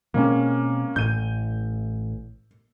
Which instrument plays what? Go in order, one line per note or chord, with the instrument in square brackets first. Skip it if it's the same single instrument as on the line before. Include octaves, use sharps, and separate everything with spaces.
[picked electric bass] B2 G#3 C4 [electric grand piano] A#3 C#4
[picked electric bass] A1 A2 [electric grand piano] G6 D#7